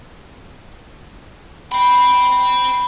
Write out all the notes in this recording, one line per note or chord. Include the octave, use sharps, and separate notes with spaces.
C5 G5 B5